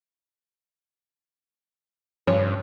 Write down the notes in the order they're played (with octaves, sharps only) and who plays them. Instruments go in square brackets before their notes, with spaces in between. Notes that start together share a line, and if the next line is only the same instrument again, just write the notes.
[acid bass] G2 [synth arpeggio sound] C#3 F3 [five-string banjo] C#5